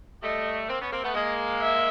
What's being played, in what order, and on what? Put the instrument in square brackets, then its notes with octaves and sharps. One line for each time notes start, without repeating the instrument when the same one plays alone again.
[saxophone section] G3 A3 [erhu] D#5
[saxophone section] A#3 C4
B3 C#4
A#3 C4
A3 B3
[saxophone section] G#3 A#3 [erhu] D#5
[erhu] E5